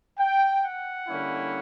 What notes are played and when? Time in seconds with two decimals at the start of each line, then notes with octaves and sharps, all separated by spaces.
0.19 G5
0.63 F#5
1.07 D3 G3 A#3 C#4 E4